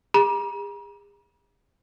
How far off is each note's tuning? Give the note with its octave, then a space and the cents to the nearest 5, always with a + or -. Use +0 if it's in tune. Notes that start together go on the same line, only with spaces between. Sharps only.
G#4 -35 A#5 +45